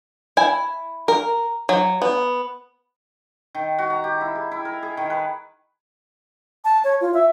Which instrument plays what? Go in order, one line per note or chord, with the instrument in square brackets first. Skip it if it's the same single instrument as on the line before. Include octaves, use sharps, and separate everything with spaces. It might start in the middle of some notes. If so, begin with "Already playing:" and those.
[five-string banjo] E4 G#5
A#4
F#3
B3
[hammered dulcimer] D#3
F#4
A#5
G4
E4
G#4
E4
A#4
G#4
D#3
B4
[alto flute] A5
C#5
F4
E5